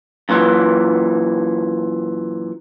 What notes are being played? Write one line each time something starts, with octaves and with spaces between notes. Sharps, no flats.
F#2 A#2 D#3 E3